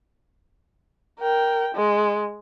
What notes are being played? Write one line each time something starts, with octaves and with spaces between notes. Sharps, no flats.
A#4 G5
G#3